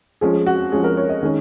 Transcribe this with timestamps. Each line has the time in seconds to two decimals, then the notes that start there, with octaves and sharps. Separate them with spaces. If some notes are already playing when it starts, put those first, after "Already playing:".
0.21 F3 G#3 C#4 G#4
0.46 F#4
0.72 F3 G#3 C#4 G#4
0.84 A#4
0.97 C#5
1.09 D#5
1.23 D#3 G#3 C#4